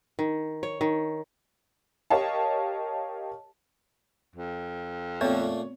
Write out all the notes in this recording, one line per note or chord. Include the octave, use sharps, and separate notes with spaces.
D#3
C#5
D#3
G4 A#4 C#5 D#5 F5 A5
F2
A#2 A3 B3 C4 C#5